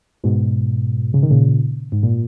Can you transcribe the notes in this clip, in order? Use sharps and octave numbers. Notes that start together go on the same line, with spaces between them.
G#2 B2
C#3
D#3
A#2 C#3
G#2
A#2